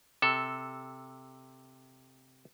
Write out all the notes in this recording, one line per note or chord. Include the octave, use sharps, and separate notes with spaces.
C3 A4